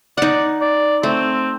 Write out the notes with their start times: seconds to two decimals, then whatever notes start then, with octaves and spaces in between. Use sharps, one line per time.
0.18 D#4 D5 F#5
0.61 D5
1.03 A3 C4